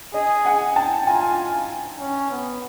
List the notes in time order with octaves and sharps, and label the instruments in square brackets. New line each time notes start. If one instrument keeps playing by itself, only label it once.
[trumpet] G#4 [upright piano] D#5
[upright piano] F#5 G#5
G5 A5
[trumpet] F4 [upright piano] G#5 A#5
[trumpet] C#4
B3